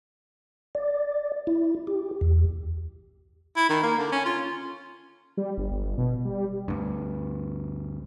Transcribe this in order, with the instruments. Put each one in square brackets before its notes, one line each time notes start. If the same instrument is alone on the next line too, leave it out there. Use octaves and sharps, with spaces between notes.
[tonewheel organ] D5
E4
G4
E2
[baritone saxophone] E4
D#3
A#3
D3
C#4
F4
[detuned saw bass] G3
G1
G1
B2
G3
[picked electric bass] D2 G2